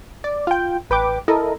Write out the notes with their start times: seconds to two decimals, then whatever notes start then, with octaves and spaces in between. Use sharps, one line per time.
0.24 D5
0.47 F4 G5
0.90 A1 B4 G5 D6
1.28 E4 A4 A#4 D#5